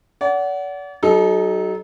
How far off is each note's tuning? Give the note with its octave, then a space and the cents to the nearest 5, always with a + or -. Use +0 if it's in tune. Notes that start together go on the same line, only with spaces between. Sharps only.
D5 -40 F#5 +10
F#3 +35 D#4 +0 A4 -30